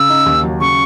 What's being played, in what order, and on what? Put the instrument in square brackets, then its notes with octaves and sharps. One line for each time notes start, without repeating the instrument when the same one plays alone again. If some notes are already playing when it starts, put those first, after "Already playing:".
Already playing: [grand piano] C#3 [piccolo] E6
[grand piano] D#4
D#2
F#3
[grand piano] C#3 [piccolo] C#6